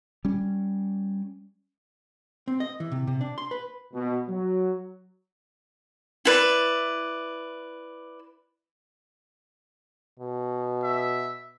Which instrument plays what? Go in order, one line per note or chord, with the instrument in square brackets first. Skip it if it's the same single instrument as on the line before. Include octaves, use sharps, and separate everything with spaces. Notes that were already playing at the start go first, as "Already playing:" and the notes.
[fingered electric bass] G3 C#4
[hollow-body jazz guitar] C4
D#5
E3
C3
C3
D4
C6
B4
[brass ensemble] B2
F#3
[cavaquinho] E4 B4 D5
[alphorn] B2
[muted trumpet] E5